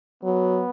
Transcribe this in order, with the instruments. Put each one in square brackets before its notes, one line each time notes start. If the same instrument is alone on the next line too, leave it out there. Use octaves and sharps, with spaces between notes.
[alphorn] F#3 [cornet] B3